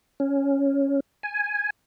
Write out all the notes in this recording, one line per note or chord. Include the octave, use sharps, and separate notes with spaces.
C#4
G#5